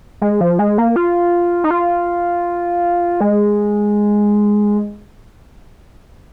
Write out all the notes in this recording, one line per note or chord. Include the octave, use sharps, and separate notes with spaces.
G#3
F3
G#3
A#3
F4
D#4
F4
G#3